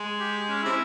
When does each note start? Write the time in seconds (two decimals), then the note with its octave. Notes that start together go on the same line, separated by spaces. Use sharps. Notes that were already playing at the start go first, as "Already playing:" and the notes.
Already playing: G#3
0.20 G4
0.49 C#4
0.63 C3 E4